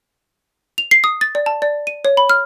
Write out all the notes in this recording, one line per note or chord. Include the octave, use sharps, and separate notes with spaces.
F7
C7
D#6
A6
D5
A5
D5
D#7
C#5
B5
F6